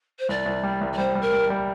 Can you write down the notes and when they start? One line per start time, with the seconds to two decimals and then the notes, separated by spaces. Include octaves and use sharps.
0.19 C5
0.29 C2 D5
0.46 C2
0.63 G3
0.81 C2
0.92 D5
0.98 G3 C5
1.15 G3
1.21 A#4
1.32 G3
1.50 G3